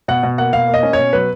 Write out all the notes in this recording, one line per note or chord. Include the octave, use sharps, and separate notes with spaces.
B2 F#5
B2
A#3 F#5
B2 F5
A#3
D#5
C#4
C#5
B2
F#3 B4